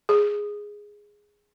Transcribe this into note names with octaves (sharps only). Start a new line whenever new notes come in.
G#4